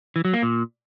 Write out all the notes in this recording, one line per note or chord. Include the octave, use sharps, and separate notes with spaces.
E3
F#3
A#3
A#2